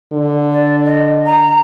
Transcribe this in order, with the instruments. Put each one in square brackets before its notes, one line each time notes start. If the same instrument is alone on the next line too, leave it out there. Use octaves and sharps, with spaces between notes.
[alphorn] D3
[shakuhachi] D5
D#5
A#5